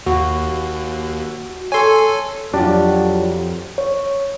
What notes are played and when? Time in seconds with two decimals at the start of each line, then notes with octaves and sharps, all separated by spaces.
0.07 D#2 F#4
1.72 A4 C#5 G#5 C6
2.54 F2 F#3 D4 F4 G4
3.78 C#5